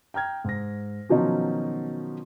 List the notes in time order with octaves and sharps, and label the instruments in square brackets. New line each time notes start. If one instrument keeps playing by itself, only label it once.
[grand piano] G5 A#5 F6 G#6
G#2 A#6
B2 D#3 F3 F#3 C#4 D#4